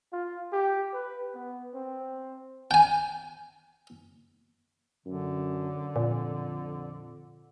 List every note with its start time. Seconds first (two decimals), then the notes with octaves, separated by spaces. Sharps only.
0.13 F4
0.52 G4
0.94 B4
1.35 B3
1.74 C4
2.71 G5 G#5
5.06 F#2 D3
5.96 F2 A#2